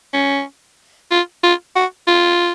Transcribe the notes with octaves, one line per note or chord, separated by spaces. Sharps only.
C#4
F4
F4
F#4
F4